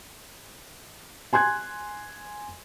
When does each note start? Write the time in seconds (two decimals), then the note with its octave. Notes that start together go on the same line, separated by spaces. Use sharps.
1.33 G#5 C6 F#6 G#6